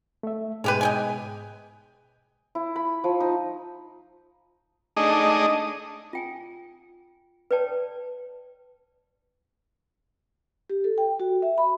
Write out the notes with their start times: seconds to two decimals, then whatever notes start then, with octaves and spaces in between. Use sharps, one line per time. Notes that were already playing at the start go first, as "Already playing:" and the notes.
0.23 A3 E5
0.64 G#2 B2 C#4 G4 G#4 B4
0.81 D#5 G5 G#5
2.55 E4
2.76 B5
3.04 F3
3.20 D#4
4.97 A3 D4 D#4 G#4 D#5
6.13 F4 G5 G#5
7.51 B4 C#5 D5 G5 A5
10.70 G4
10.84 A4
10.98 G5
11.20 F#4
11.42 E5
11.58 B5